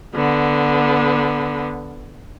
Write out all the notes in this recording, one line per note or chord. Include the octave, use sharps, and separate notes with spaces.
D3 B3